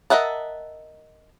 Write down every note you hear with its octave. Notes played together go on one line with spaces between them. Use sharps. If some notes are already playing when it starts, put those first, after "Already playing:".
A#4 D#5 E5 F#5 A5